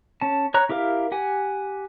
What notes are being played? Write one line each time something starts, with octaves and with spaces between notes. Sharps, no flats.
C#4 A5
C#5 A#5 F#6
E4 G4 A#4 F5
G4 F#5 G#5